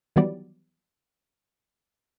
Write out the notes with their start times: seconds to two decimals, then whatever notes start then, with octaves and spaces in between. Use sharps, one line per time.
0.16 D#3 E3 F#3 G3 B3 D5